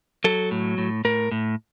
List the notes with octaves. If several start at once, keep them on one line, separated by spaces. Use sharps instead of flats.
F#3 A4
A2
A2
A2 A#4
A2